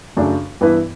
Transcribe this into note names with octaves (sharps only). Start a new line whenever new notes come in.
F#2 C#3 F#3 A3 D4
G2 E3 B3 E4 B4